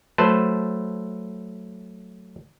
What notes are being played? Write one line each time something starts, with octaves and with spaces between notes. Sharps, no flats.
F#3 A3 B4 C5 A5